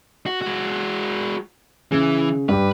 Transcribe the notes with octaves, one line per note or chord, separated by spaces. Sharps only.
F#4
G#3 F#4
C#3 E3
G2 G4 B4